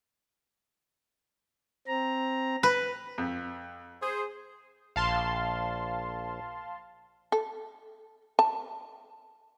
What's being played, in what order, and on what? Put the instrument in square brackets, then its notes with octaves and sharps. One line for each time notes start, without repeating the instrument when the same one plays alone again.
[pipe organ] C4 A#5
[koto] B4
[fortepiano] F2
[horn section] G#4 C5
[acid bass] A#1 [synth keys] F5 A5 C6
[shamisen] A4
A5